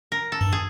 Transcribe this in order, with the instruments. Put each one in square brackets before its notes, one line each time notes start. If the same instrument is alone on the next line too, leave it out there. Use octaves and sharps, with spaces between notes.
[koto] A#4
A4
[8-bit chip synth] G2
[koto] G#4